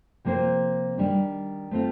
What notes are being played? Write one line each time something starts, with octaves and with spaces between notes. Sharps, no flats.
C3 F3 A#3 F4 C5
D#3 G3 D4
A3 C4 F4